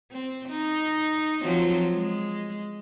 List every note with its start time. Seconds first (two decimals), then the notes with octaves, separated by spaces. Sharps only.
0.12 C4
0.49 D#4
1.42 F3 F#3 C4
1.93 G#3